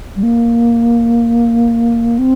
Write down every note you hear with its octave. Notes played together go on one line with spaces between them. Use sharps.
G3
A#3
C4